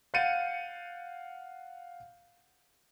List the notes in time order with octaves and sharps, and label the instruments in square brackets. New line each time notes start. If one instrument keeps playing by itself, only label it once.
[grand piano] F5 F#5 G6 A6 C#7 D#7